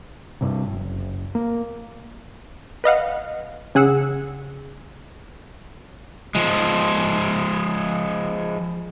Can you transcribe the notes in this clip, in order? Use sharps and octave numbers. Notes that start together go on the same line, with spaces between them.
G2 C3
F#1
A#3
B4 D#5 F5 F#5
C#3 G#4 F#5 E6
F3 G#3